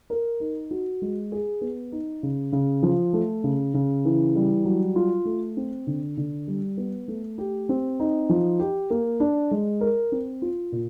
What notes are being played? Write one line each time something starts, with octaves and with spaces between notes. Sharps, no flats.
A#4
D#4
F#4
G#3
G#4
B3
D#4
C#3
C#3
F3
A3
C#3
C#3
E3
G3
F#3
F4
A3
C4
D3
D3
G3
B3
A3
G4
C4
D#4
F3
G4
A#3
D4
G#3
A#4
C4
F4
A#2